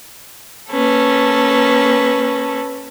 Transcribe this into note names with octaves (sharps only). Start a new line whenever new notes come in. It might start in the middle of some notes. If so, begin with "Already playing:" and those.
A#3 C#4 A4 B4